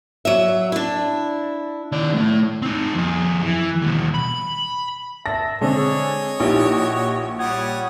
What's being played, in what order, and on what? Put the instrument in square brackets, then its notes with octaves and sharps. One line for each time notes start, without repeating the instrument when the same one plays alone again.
[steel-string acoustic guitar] F#3 E5
D4 E4
[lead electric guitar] D#3 D5
A2 A3
[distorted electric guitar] C4 D#4
F2 G#4
E3
D#2 B2
B5
[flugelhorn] E5 [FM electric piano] A5 [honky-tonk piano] A#6
[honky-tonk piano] D3 [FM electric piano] G#3 C4 [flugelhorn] G#4 [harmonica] C#5 D#5
[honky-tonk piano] A#1 [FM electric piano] D#4 E4 G4 [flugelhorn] F#4
[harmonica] G3 C#5 D#6 [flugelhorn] F#5 [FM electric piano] G#6